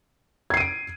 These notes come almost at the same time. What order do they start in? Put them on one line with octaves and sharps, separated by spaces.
G#6 C7 D#7 D7